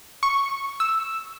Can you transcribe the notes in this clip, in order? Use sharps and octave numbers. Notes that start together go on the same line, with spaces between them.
C#6
E6